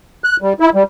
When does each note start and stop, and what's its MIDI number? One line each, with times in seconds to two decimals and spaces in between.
0.24 0.37 90
0.42 0.53 55
0.60 0.70 64
0.75 0.83 55